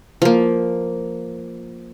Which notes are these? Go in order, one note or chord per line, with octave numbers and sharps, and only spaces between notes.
F3 A#3